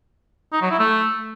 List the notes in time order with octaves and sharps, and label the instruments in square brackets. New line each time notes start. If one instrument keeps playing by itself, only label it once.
[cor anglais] D#4
F#3
E4
A3